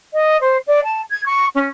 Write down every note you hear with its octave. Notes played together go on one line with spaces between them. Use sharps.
D#5
C5
D5
A5
G#6
C#6
C#4